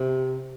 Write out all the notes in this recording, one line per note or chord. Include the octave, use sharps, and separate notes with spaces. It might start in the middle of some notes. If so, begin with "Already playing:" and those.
Already playing: C3